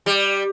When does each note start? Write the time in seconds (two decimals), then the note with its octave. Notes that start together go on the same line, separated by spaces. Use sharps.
0.06 G3